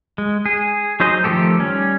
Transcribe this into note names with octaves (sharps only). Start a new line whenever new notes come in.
G#3
G#4
F#3 D#4 G#4 C5 D#5
D#3 F3 A3 G4 A4
G3 C#4